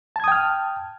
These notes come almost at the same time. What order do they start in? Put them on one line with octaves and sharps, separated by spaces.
A5 G#6 D#6 G5 F6